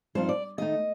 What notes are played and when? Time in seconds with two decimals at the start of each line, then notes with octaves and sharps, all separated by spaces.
0.15 G2 F3 C4 D#4 C5
0.29 D5
0.58 D#3 A3 D#4 D#5